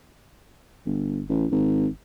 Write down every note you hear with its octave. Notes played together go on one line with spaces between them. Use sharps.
G1
A1
G#1